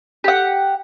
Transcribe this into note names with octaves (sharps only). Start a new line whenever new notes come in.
G4 F#5